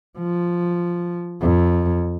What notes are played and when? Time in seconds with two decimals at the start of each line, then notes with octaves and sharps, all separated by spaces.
0.18 F3
1.42 F2